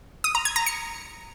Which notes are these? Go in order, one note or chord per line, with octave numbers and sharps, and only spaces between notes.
D#6
A#5
G#6
A#5
C#7